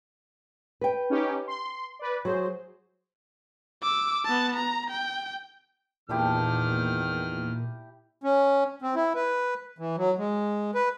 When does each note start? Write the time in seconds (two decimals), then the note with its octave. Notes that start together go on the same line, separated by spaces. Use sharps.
0.81 B4 G5
1.10 C#4 D#4 G4
1.48 C6
1.99 B4 D5
2.25 F#3 G#4 C5
3.83 D6 E6
4.24 B3 A5
4.56 A#5
4.90 G5
6.09 E2 A#2 D#3 D4 E4 G4 F6
8.23 C#4
8.82 C4
8.95 E4
9.15 B4
9.78 E3
9.97 F#3
10.18 G#3
10.75 B4